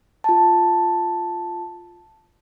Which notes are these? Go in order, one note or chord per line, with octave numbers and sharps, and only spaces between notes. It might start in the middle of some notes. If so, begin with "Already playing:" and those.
F4 A5